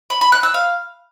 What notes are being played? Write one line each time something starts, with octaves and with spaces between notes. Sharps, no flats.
B5
B5
F#6
E6
F5